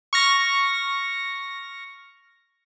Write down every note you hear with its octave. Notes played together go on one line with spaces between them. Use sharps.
C#6 F6 A#6